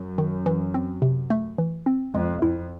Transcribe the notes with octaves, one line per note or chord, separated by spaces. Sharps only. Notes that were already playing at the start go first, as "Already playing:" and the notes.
Already playing: F#2 F#3
D#3
E3
C4
C3
A3
E3
C4
F2 G#3
F2 E4